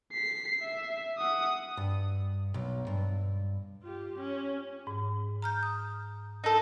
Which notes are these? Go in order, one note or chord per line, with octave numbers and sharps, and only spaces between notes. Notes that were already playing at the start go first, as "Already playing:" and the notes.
B6 C7
E5
F#5 D#6
G2
B1
G2
F4 G4
C#4
G#2
A#5 F6 G6
D#6
D#4 A4